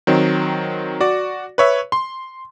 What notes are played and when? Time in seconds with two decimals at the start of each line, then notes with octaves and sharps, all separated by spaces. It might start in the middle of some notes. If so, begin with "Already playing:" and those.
0.07 D#3 F#3 C4
1.00 F#4 D5
1.58 B4 C#5 E5
1.92 C6